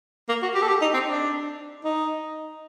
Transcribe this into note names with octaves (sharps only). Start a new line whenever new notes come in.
A#3
F#4
G4
A4
G4
D#4
C4
D4
D#4